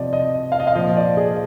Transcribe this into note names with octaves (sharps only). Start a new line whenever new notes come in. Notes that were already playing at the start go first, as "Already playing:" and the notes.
Already playing: C3 F3 D5 D#5
D#5
F5
D#5
F5
A#2 F3 D#5
D5
G#4